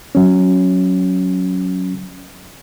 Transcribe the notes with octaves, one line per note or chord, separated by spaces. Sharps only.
F#3 C#4